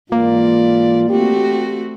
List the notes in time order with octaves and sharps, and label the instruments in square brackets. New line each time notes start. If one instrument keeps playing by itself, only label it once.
[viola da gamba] G#2 E3 D5 [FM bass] A#3 [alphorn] F4
[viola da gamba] A3 C4 F#4 [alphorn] G4